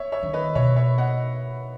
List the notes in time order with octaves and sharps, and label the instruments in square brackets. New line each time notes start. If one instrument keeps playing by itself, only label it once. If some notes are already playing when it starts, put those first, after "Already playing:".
Already playing: [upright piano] C#5 E5
C#5 E5
[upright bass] D#3
[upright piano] B4 D#5
[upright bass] B2 [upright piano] C#5 E5
[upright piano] C#5 E5
D#5 F#5